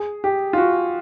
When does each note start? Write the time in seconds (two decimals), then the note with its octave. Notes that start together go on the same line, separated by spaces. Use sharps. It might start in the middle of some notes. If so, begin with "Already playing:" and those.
Already playing: G#4
0.24 G4
0.53 F4
0.58 F#4